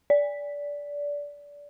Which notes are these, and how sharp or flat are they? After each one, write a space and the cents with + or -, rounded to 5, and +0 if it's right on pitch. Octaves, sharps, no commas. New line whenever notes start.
D5 -20